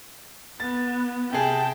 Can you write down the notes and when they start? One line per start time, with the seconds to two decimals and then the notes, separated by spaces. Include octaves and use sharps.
0.60 B3 A6
1.33 C3 G#4 G5 A5